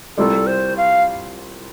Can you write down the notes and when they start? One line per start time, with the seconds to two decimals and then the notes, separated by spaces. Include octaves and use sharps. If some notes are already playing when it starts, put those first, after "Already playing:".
0.17 C2 C3 G3 F4 A4 D5
0.47 C5
0.77 F5